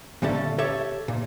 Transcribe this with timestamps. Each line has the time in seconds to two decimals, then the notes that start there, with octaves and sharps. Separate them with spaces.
0.22 A#2 D3 G3 C#4 A4 E5
0.58 G4 A4 C#5 E5
1.08 A#2